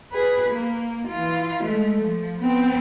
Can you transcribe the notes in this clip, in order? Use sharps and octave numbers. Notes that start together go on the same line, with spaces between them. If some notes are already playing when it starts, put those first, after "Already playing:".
G#4 B4
A#3
E3 F4
G#3 A3
F3
B3 C4